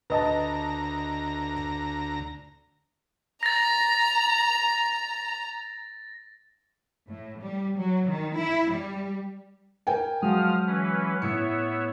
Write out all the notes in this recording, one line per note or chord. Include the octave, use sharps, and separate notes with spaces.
D2 B4 D#5 A5 A#5
A#5 A6 A#6
A2
G3
F#3
D#3
E4
G3
A#4 G5 G#5
F3 F#3 G#3 D#6 F6
E3 C#4 B4
A2 B3 C#5 E5 C#7